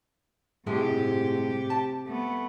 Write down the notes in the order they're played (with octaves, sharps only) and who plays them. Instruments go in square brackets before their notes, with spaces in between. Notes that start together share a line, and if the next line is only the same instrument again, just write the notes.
[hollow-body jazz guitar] A2 G#3 A3 [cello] C3 G4
[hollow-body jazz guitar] A5
[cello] A3 B3